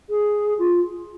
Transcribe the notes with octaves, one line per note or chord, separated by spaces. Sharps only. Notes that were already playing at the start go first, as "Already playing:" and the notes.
G#4
F4